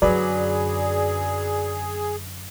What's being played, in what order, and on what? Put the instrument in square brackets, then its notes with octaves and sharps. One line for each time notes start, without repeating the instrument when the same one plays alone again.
[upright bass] F#2 D3 [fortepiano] F#3 B4 [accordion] G#4 [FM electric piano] D5